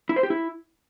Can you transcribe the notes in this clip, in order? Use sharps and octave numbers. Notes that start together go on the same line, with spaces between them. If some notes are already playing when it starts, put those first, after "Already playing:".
E4
C5
G4
E4